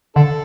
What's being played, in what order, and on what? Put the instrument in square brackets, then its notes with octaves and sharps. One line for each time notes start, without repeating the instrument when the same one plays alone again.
[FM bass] D3 [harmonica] D4 A4